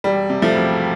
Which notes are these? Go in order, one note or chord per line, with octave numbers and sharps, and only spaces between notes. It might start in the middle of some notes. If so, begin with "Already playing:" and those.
E1 G3
C3
F3 A3
E1